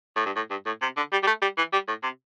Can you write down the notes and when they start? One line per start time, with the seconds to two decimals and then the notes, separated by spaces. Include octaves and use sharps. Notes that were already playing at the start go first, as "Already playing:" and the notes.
0.16 A2
0.26 G2
0.36 A2
0.51 G2
0.66 A2
0.82 C3
0.97 D3
1.12 G3
1.23 G3
1.27 A3
1.42 G3
1.57 E3
1.73 G3
1.88 A2
2.03 C3